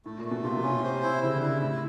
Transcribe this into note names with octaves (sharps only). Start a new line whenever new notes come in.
A2 A3
A#2
A3
B2
C3 F4
C3
C#4
C3
C5
E4
C#3 E4
D3
E4
C#3
A2 E4